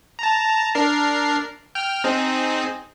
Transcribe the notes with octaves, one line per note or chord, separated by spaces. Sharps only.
A5 A#5
D4 A#4 C7
G5 F6
C4 D#4 G#4